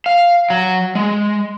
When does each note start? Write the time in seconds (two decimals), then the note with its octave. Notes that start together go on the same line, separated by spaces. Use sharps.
0.06 F5
0.50 F#3
0.95 G#3